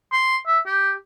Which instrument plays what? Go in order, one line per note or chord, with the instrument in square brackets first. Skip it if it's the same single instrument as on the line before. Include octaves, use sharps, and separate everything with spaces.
[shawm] C6
E5
G4